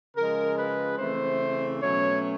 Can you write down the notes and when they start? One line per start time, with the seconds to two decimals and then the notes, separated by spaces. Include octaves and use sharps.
0.15 C#3 F3 G#3 A#4
0.58 B4
0.98 C#3 E3 A3 C4 C5
1.81 B2 F#3 A3 C#4 C#5